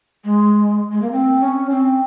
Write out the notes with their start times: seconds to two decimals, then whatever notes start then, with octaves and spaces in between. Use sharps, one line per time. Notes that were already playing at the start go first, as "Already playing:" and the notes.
0.24 G#3
0.92 G#3
1.02 A#3
1.12 C4
1.41 C#4
1.70 C4